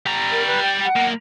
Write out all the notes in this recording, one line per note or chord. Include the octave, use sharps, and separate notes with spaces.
G3 A#5
A#4
B4
G5
F#5
B1 A#3